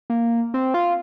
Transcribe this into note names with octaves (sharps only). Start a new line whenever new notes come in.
A#3
C4
F4